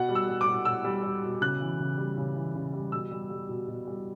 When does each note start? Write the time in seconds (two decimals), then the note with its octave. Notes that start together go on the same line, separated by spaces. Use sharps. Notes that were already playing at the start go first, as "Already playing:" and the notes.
Already playing: B2 F#5
0.09 G3
0.15 E6
0.28 G3
0.41 D6
0.47 B2
0.65 B2 E6
0.84 G3
1.03 G3
1.23 B2
1.41 C#3 F#6
1.60 E3
1.79 C#3
1.98 G3
2.17 C#3
2.36 E3
2.55 C#3
2.73 G3
2.92 B2 E6
3.11 G3
3.30 G3
3.49 B2
3.68 B2
3.87 G3